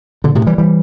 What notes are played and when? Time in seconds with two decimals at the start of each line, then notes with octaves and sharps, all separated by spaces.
0.24 A#2 D3
0.35 A2 C3
0.47 E3 G3
0.58 E3 G3